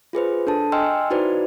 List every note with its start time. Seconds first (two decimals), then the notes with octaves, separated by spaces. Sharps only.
0.13 F4 G#4 B4 C5
0.47 D4 A4 A5
0.72 D#5 G5 G#5 C6 E6 F6
1.10 D#4 E4 F#4 B4 C5 D5